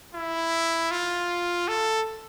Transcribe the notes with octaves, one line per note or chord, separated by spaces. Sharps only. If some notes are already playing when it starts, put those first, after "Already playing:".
E4
F4
A4